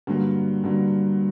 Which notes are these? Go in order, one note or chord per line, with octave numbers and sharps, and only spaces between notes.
G2 D3 F#3 A#3
G2 D3 F#3 A#3